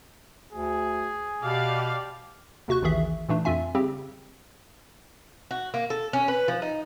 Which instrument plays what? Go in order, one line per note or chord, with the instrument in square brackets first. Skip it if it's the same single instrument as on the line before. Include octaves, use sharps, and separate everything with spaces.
[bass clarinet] D2 [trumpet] G#4
[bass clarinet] B2 [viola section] G4 D5 F5
[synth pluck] D#2 C3 F#4 C#6 F#6
A1 D#2 D#3 E3 G#4 E5
A#2 E3 A3 D4
F2 C4 F4 E5 G#5
C#3 G3 C4 G4
[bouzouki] F#4
A#3
A4
C#4
B4
F3
D#4